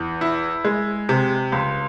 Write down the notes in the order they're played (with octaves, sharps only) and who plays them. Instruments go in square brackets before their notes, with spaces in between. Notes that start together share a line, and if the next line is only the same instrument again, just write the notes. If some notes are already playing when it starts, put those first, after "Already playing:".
Already playing: [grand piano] E2
E4
G#3
C3
C#2